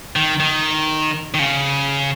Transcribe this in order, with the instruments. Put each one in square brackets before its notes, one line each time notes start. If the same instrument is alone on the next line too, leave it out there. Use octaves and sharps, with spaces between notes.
[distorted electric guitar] D#3
D#3
D#3
C#3